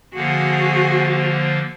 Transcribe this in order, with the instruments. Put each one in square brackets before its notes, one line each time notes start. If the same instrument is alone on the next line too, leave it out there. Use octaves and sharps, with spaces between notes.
[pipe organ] D3 F3 A#3 [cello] F#4 G#4